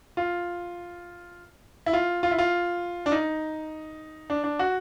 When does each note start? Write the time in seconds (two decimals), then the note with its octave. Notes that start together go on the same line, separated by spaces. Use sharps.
0.17 F4
1.86 E4
1.93 F4
2.23 F4
2.31 E4
2.38 F4
3.06 D4
3.12 D#4
4.30 D4
4.44 D4
4.59 F#4